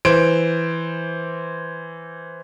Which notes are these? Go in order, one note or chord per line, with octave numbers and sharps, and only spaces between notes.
E3 C5 D7